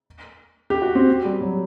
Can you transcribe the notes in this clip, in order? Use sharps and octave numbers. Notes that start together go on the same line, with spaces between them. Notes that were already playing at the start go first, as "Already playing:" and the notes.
G4
F#4
C4
G3
F#3